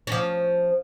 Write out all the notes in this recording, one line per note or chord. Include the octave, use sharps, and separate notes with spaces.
F3 C#4